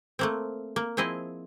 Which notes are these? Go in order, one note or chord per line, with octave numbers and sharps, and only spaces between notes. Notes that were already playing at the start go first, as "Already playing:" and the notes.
A3 A#3 C4
A#3
F3 C4 E4 G#4 D#5